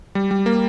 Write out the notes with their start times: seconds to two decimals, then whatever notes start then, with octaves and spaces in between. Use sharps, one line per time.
0.15 G3
0.31 G3
0.46 A#3